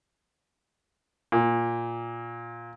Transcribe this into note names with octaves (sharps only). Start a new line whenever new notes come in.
A#2